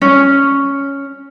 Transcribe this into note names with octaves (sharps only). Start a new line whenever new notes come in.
C#4